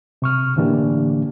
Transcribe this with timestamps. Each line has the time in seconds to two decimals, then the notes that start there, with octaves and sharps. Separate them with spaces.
0.22 C3 C#6 F6
0.56 A2 D3 E3 A#3 D4 G4